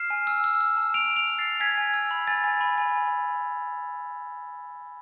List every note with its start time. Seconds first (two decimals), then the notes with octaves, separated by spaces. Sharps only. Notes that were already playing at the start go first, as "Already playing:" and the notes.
Already playing: F6 C7 E7
0.10 G#5
0.27 E6
0.44 E6
0.61 E6
0.77 A5
0.94 A5 D7 F7
1.10 A5
1.16 D7 F7
1.27 E6
1.39 A6 C7
1.44 E6
1.60 G#5 G#6 B6
1.78 G#5
1.94 E6
2.11 B5
2.27 G#5 A6
2.44 G#5
2.61 B5
2.78 G#5